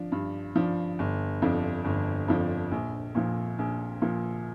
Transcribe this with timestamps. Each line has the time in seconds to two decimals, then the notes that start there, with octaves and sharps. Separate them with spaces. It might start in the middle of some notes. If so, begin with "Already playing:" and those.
Already playing: F3 D4
0.12 G2
0.56 F3 D4
0.99 G1
1.42 F2 F3 D4
1.85 G1
2.28 F2 F3 D4
2.71 A#1
3.15 A#2 F3
3.59 A#1
4.02 A#2 F3